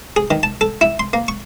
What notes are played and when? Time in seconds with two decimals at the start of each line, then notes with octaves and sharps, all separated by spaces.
0.16 G#4
0.31 D#3
0.43 A5
0.61 A4
0.81 E4
0.99 C6
1.13 A#3
1.28 C#6